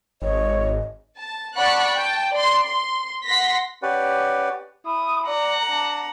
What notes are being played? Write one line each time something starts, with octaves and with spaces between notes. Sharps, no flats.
G#1 C#5 D#5
A5
D5 F#5 A5 B5 C#6 F#6
G5 A5
D5 C6
C6
F#5 C6 A#6 B6
C#4 G4 B4 D5 F#5
E4 D#6
D5 F#5 A#5
D4